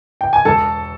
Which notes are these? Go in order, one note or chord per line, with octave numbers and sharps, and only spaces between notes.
G5
G#5
E1 A4 A5